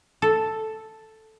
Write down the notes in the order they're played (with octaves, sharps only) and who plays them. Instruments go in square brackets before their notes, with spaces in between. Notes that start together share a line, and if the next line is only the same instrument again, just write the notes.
[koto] A4